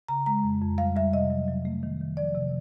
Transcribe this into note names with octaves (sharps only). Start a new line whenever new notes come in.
C#3 A#5
G#3 A#5
F2
F2
G3 F5
G3 E5
C3 D#5
F#3
F#3
A3
D#3
D#3
F3 D5
C3